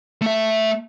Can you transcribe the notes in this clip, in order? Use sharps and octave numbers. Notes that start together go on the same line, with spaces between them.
A3 E5